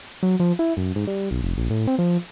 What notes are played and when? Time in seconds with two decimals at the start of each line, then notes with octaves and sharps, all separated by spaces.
0.23 F#3
0.40 F3
0.59 E4
0.77 F#2
0.96 G#2
1.07 G3
1.31 B1
1.43 F1
1.58 A#1
1.70 A2
1.87 C4
1.98 F3